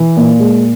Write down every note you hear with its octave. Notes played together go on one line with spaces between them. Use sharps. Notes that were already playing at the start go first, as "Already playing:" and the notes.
Already playing: E3
A#2
G#3